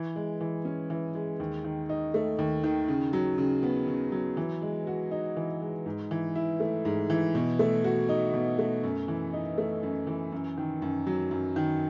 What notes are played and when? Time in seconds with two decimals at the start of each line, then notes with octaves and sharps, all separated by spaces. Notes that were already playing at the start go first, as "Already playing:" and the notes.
Already playing: E3
0.16 G#3
0.41 E3
0.65 C#4
0.90 E3
1.15 G#3
1.40 D#2
1.64 D#3
1.89 D#4
2.14 A3
2.39 D#2
2.64 D#3
2.88 C#3
3.13 F#3
3.38 C#3
3.63 B3
3.88 C#3
4.12 F#3
4.37 E3
4.62 G#3
4.87 F#4
5.11 D#4
5.37 E3
5.61 G#3
5.86 G#2
6.11 E3
6.35 E4
6.60 A3
6.85 G#2
7.10 E3
7.35 B2
7.59 A3
7.84 F#4
8.09 D#4
8.34 B2
8.59 A3
8.83 F#2
9.08 E3
9.33 D#4
9.58 A3
9.83 F#2
10.07 E3
10.32 F#2
10.57 D#3
10.82 F#2
11.07 F#3
11.31 F#2
11.56 D#3